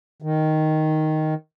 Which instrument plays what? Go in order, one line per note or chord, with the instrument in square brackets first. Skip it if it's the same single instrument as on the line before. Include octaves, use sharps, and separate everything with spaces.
[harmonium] D#3